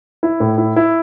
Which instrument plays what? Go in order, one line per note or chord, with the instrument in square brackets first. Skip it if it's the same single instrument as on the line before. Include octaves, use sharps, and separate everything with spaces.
[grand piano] E4
A2
E4
E4